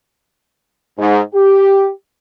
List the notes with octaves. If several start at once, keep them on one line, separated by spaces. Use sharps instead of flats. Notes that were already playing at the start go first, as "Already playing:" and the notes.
G#2
G4